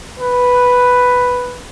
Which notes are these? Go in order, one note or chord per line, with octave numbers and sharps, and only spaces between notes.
B4